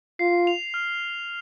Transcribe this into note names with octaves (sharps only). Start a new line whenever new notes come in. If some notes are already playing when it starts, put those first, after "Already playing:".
F4 C7
F7
F6